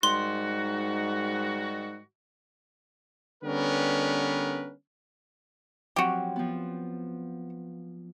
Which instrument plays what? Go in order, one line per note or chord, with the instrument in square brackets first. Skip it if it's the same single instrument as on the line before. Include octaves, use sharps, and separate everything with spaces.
[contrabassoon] G#2 [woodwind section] D#3 G3 F#4 [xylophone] C6
[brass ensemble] D3 G3 B3 C#4 A#4 B4
[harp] F3 F#3 C4 [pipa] F#4 G4
[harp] F3 B3